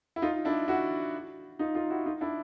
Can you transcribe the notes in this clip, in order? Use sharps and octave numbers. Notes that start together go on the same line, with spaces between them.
E4
D#4 F4
D4 E4
E4 F#4
D#4 F4
D#4 F4
E4 F#4
D#4 F4
D4 E4